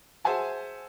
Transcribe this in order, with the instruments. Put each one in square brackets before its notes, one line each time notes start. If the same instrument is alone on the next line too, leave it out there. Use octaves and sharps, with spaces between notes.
[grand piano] G#4 C5 E5 F#5 G#5 A5